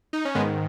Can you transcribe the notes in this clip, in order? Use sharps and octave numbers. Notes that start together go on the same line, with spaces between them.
D#4
C#4
G#2 D#3 G#3 B3